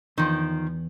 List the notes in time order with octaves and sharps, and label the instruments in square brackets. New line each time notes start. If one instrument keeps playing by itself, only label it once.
[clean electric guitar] E2 [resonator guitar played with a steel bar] D#3 F3